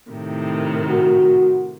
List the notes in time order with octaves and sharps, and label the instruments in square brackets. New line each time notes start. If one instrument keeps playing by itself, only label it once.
[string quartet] A2 C3 D#3
[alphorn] F#4